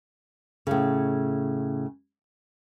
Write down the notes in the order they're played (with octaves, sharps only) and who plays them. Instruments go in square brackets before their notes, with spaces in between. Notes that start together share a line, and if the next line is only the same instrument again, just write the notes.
[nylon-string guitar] A2 C#3